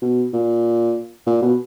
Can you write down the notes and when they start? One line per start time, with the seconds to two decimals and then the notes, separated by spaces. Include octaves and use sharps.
0.02 B2
0.33 A#2
1.27 A#2
1.42 B2